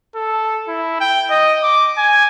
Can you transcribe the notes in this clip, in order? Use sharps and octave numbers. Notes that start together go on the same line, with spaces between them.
A4
E4
G5
D#5
D6
G#5